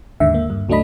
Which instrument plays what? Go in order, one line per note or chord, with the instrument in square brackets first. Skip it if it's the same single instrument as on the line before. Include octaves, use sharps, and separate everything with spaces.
[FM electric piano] D#2 G#2 D3 E5
A#3
G2
C#2 F#3 A3 D4 D#5 B5